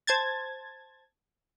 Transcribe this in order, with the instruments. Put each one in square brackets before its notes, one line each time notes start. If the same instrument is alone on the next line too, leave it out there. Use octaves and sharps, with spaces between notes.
[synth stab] C5 A5 G#6 A6